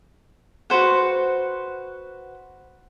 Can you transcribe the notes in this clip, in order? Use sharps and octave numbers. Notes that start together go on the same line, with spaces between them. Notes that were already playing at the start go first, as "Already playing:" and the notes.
F#4 B4 C5 F#5